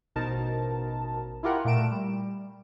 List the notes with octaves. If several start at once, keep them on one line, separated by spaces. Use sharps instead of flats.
A1 B2 D#4 A#4 C5 A5
E4 F4 G4 A#4 F#5
A#2 A3 A#4 D7 E7
G3